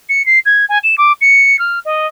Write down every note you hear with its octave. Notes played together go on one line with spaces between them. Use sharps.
C#7
C7
G#6
G#5
E7
D6
C#7
F6
D#5